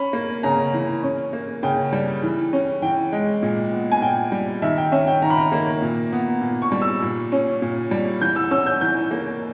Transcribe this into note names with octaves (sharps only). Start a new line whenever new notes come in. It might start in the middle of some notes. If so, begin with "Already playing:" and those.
Already playing: C#4 B5
A#3
C#3 A#5
E3
C#4
A#3
C#3 G5
G3
E3
C#4
E3 G5
G#3
A#2
B3
G#5
A#2 G5
G3
D#3 E5
G5
C#4 E5
G5
D#3 A#5
B5
A#5
A#3
A#2
B3
A#2
C#6
G3
E6
A#2
C#4
A#2
G3
E3 G6
E6
C#4 E6
G6
E3 G6
A#3